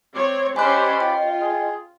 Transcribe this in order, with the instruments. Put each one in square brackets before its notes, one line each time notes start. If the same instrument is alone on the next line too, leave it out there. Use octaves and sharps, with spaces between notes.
[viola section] C4 C#5 [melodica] D5
[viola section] C#4 G4 C5 [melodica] D5 B5 [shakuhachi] D#5 [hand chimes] G#5 F#6
[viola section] F4 [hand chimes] G5
[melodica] G#4